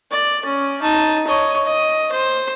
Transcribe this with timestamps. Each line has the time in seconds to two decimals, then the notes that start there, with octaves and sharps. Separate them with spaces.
0.11 D5
0.45 C#4
0.82 D#4 A5
1.27 C#5 D#5
1.66 D#5
2.12 C5